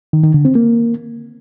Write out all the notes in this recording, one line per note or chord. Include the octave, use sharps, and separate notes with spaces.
D#3
D#3
D3
C4
A#3